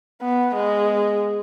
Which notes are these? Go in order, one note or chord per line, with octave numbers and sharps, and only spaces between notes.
B3
G#3